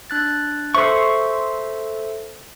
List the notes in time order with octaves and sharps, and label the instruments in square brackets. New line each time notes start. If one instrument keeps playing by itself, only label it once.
[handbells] D4 F#6 A6
[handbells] A4 C5 E5 [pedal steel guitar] C6 C#6